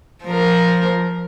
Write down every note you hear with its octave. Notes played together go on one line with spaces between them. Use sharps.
F3 A#4